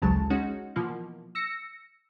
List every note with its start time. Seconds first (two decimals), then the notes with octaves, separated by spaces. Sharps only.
0.02 A1 D2 C#3 F#3 G#3 A5
0.30 G#3 C#4 D#4 F#4
0.76 B2 E3 F3 A#3
1.35 E6 A#6 C#7